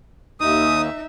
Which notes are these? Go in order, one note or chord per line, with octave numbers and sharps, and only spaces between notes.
D#2 D#4 E5 D#6